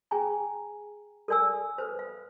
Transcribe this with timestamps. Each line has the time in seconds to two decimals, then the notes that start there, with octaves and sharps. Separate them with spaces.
0.11 G#4 G5 G#5 A#5
1.28 A4 A#4 D5 G#5 E6
1.78 A4 B4 C5
1.99 F5